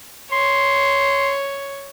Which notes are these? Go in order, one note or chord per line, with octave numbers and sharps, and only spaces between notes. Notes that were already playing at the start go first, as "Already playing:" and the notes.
C#5 C6